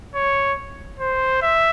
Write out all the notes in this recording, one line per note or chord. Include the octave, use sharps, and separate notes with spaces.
C#5
C5
E5